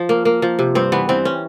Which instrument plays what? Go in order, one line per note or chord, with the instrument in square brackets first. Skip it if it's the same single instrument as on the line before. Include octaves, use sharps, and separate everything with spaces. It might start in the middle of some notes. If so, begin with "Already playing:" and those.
Already playing: [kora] F3
A#3
A#3
F3
C3
G2 C4
E3 B3
E3 C4
C#4